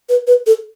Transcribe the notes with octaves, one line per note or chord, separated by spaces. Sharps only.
B4
B4
A4